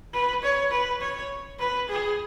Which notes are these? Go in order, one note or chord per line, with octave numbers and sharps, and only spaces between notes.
B4
C#5
B4
C#5
B4
G#4